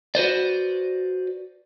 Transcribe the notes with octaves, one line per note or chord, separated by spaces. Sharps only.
F#4 B4 C5 D5